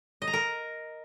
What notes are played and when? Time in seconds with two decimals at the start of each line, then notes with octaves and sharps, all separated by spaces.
0.22 D#5
0.28 A#5
0.33 A#4